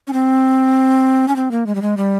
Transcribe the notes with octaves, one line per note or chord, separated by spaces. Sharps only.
C#4
C4
C#4
C4
A#3
G#3
G3
G#3
G3